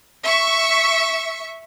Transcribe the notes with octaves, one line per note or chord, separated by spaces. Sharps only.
E5 C#6